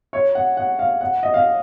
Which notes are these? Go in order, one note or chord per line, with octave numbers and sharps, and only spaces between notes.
C#5
F#5
F#5
F5
F#5
D#5
F5